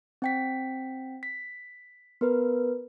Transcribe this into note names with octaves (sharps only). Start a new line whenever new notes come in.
C4 G5 B6
B6
B3 A#4 B4